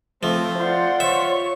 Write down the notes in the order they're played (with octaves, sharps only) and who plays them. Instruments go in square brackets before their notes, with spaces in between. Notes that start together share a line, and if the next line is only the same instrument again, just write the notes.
[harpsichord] F3 [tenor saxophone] A3 [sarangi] C4
[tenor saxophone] F4 [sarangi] C5 [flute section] D5 F#5 C6
[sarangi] C#5 [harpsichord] E5